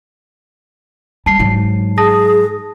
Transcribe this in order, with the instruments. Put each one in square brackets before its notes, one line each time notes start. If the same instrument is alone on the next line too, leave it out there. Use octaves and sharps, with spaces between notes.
[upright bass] G3 [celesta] A5 C7
[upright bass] G#2 F#3
[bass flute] G#4 [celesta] A5 D#6 A#6